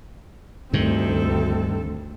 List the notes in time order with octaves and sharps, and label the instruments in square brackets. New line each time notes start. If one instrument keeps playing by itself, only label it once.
[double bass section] D2 [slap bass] G2 D#3 [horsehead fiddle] C4 A4